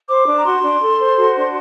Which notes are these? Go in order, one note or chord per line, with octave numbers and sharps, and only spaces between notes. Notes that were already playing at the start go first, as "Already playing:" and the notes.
C5 D6
D4
A#5
F#4 C6
D4
A4
C5
F#4
D4